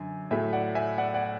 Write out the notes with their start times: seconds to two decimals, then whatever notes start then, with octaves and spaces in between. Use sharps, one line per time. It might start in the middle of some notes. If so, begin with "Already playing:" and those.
Already playing: F#2 D3 G#5
0.31 A2 F#3 A3 E5 G#5
0.53 D5 F#5
0.75 E5 G#5
0.98 D5 F#5
1.14 D5 F#5